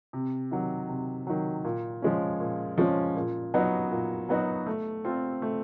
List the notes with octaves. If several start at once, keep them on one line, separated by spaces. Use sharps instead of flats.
C3
D#3 F#3
C3
D#3 F#3
A#2
F3 G#3 C#4
A#2
F3 G#3 C#4
A#2
F#3 B3 D#4 F#4
A#2
F#3 B3 D#4 F#4
A3
C4 F4 A4
A3